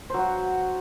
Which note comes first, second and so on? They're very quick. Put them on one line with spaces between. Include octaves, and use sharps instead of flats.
C5 F#3 F#4